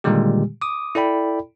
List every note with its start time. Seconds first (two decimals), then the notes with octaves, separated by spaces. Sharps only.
0.04 A#2 D3 D#3 G3 G#3 G4
0.62 D6 D#6
0.95 E4 A4 D5 G5 B5